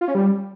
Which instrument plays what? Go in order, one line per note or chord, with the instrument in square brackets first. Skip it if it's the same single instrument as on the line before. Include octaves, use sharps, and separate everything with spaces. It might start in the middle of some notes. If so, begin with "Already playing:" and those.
[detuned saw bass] F4
C#4
G3